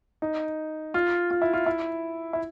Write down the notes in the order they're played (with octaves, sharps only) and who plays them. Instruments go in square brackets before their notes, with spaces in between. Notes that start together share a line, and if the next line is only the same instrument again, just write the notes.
[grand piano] D#4
F4
F4
E4
F4
E4
E4